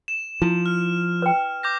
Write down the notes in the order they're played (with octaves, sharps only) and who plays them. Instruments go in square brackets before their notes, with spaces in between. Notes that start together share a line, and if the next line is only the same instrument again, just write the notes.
[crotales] E7
[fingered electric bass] F3 [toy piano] E4
[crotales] F6
[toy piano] B4 G5
[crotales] D6 G6 A#6